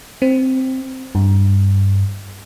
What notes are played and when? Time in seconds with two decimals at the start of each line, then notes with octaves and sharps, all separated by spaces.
0.22 C4
1.15 G2